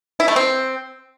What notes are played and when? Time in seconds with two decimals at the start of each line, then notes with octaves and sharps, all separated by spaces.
0.20 E4
0.28 A3
0.36 C4